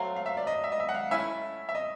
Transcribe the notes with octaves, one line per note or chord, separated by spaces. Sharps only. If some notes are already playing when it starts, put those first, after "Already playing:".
Already playing: F#3 A3 C4 F5
F5
E5
D5
D#5
E5
D#5
E5
F#5
F5
A3 C#4 E4 E5
E5
D#5